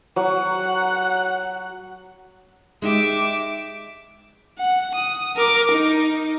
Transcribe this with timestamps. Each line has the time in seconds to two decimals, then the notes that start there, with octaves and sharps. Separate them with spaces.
0.16 F#3 F#5
2.82 G#3 D#4 G4 E5 D6
4.59 F#5
4.95 D#6
5.36 A#4 D6
5.71 D#4